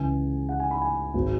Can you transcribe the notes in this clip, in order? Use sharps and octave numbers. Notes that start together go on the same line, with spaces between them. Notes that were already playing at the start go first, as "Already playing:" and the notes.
Already playing: C#2 C#3 E3 G#5
F#5
G#5
B5
G#5
G#1 F#3